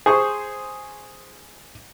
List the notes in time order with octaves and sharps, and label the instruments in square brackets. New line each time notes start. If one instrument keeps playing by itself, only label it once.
[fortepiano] G#4 C5 C#6